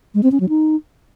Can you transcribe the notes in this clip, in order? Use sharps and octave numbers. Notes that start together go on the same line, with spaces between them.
G#3
C4
C#4
F#3
D#4